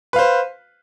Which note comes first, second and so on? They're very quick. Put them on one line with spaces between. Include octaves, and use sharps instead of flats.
B4 F5 C5